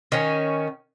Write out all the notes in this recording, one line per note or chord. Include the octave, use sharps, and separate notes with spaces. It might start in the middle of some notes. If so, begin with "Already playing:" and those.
D#3 C#4